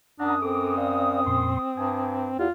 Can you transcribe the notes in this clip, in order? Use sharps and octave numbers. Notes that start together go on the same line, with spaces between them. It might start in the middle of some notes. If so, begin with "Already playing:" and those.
F#2 D4 F#5 A#5 D#6
C4 A4 D6
D5 F5
F2 A#2 C6
G2 G#5
E2 E4 F4 G4